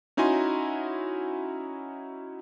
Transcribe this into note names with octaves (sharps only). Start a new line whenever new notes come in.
C#4 D#4 E4 F#4 G#5 C6